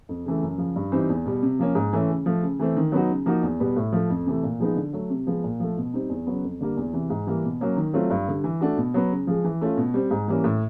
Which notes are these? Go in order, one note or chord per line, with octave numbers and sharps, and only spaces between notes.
F2
C#3 E3 A3
F#2
C#3 F3
G2
E3 G3 C4 D#4
E2
B2 G3
C3
F3 A#3 C#4
G#2
E3 A3 C#4
C#3
F3 A3
C#3
E3 A3 C4
D#3
F#3 B3 D#4 F#4
C#3
F3 A#3 D#4 F#4
E2
B2 G3 B3
A2
F3 A3
F2
C3 E3 A3
A#2
F3 G#3 B3 D#4
D3
F#3 A3
C3
F3 G#3 B3
A#2
F3 A3
B2
G3 C4 D#4
E2
C#3 F#3 B3
F2
D3 G3 A#3
E2
C3 E3
G#2
E3 G3 A#3
B2
F#3 A#3 C#4
D#3
F#3 A3 C4 F4
G2
D3 G3
E3
A3 D4 F#4
B2
F#3 B3
C#3
F3 G#3
E3
A3 C#4 F4
B2
G3 C4
G#2
E3 G3 A#3 C#4
A2